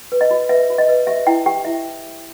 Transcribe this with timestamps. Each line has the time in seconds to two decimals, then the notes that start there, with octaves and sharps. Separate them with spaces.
0.12 B4
0.21 D#5
0.31 F#4
0.49 B4 E5
0.70 F#4
0.78 D#5
0.89 B4
1.07 G4 E5
1.27 E4 G5
1.46 G4 G5
1.65 E4 E5